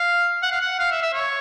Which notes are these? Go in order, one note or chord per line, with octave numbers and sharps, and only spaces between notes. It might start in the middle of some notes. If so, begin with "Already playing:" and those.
Already playing: F5
F#5
F5
F#5
F5
E5
E5
C#5